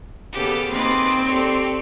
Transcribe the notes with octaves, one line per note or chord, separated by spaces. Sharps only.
D#2 C#3 B3 G4 A4
A#3 C4 D#4 G#4 B4 D5
G4 A4 C#5 D5